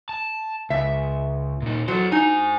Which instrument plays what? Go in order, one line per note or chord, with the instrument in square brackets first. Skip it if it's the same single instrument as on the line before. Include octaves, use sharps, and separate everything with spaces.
[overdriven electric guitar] A5
[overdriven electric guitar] C#2 [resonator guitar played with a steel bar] E5
[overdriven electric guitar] A#2 D#4
[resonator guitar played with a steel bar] F#3 [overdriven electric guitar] A4 C5
[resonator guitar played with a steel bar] D#4 [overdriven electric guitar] C5 G#5